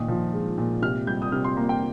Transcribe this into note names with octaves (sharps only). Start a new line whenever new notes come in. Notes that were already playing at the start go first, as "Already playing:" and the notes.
Already playing: A#2 D#3 D#6
F3
G#3
A#2
C3 F6
G3 G6
D#6
C3 F6
C6
A#3 A#5
G5